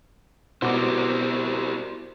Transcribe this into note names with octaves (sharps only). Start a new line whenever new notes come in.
B2 E4 G4 A#4 C5 D6